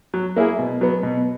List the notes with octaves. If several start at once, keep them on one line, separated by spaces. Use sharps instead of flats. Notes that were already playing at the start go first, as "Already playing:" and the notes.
F#3
A#3 E4 G#4
B2
F#3 B3
B2